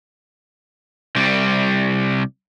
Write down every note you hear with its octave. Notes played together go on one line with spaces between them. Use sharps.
C2 G3